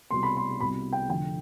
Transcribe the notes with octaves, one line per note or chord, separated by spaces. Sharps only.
C2 B2 C6
B5
C6
C2 B2 B5
G5
F1 F2 D3 G5